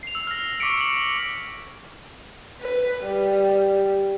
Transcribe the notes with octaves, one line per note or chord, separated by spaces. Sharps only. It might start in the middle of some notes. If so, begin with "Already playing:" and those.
C7 F7
E6
F6 A#6
C#6 D6 E6 B6 C#7 D7
F#7
B4
G3